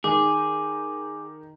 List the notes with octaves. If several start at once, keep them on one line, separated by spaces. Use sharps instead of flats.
D#3 G#4 D6